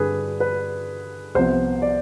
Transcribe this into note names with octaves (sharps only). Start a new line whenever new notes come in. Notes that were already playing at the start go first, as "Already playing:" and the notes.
Already playing: G2 D3 G#4 B4
B4
C2 C3 F3 B3 C5
D5